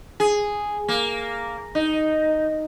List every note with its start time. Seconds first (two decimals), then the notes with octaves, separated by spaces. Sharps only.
0.20 G#4
0.88 A#3
1.75 D#4